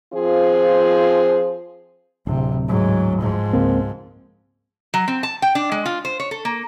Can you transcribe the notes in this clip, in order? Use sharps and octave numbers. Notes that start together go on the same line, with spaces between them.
F3 C4 F4 G#4 C5
D1 C3
G#2 F#3
G#2 F3
C#2 A#3 C4
F#3
C4
A5
G5
D4
G#3
F4
C5
C#5
A4
A#3